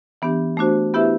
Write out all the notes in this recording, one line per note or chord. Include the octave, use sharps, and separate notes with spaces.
E3 B3 D4 G4
A3 D4 F#4 C5
B3 E4 G4 B4 E5